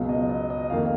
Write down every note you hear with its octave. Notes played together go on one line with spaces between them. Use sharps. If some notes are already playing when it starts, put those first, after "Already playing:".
Already playing: C#2 B2 F#3 F5
D#5
D#5
D#5
F2 D#3 A#3 F5